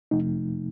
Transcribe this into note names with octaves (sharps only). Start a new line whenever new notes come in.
F2 C3 F3 A3 D#4